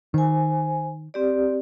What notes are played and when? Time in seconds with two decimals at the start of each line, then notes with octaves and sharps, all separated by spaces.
0.14 D#3 C5 G#5
1.14 C4 G4 D5